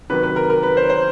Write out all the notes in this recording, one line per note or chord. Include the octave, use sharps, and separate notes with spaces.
C3 D#3 F#3 B4
B4
A#4
A#4
B4
C5
C5